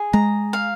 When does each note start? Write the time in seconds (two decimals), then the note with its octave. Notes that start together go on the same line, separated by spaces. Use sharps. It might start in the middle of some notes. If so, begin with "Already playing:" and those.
Already playing: G#4
0.13 G#3 A#5
0.53 F5